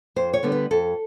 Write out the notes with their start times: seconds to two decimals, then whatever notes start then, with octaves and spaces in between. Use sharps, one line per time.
0.16 F2 C5
0.33 C#5
0.43 D3 G3 B3
0.52 B4
0.71 F2 A4